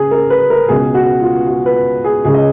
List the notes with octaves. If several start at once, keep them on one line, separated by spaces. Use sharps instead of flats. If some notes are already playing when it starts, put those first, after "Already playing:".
Already playing: C#3 G#4
A#4
B4
A#4
C#2 B2 G#4
F#4
F4
F#4
B4
G#4
C#2 C#3 G#4
D#5